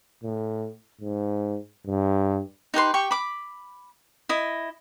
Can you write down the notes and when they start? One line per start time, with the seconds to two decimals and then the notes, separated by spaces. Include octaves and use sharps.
0.24 A2
1.01 G#2
1.86 G2
2.74 D#4 G4 B4 C6
2.94 G4 G5 C#6
3.11 B5 D6
4.29 E4 D#5